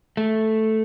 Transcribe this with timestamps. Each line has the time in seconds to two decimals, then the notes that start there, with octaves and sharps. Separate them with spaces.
0.17 A3